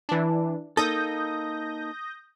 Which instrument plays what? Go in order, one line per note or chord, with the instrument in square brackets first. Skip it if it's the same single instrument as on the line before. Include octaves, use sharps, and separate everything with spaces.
[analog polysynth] E3 D4
[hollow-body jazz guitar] A#3 D#4 A4 [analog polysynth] D#6 G6 A#6